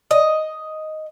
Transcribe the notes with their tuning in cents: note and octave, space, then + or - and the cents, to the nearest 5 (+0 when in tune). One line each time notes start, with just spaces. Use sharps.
D#5 +5